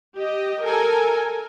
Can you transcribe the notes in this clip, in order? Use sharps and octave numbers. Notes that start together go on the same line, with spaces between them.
G4 D#5
A4 A#4 G#5